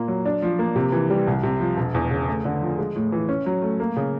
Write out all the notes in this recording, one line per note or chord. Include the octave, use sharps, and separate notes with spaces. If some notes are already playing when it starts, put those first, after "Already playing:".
Already playing: A#2 A#3
F#3
D4
F3
A#3
C3
E3
G3
C2
C3
F3
E1
E2
C#3
A3
D3
F3
G#3
A2
E3
C#4
F#3
A3
A#3
C#3